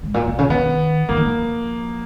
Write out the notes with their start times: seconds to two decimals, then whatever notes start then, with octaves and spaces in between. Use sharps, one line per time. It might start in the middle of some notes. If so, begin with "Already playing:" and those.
0.03 G#2
0.14 A#2
0.27 B2
0.39 C#3
0.50 D#3 B3
1.09 F3 A#3
1.17 D#3
1.25 F3